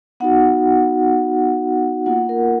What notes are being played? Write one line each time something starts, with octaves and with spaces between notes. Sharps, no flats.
B3 D#4 F#4 F#5
A#3 F4 F#5
A#4